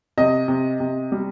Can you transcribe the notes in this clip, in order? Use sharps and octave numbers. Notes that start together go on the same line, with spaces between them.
C3 D#5
C3
C3
G3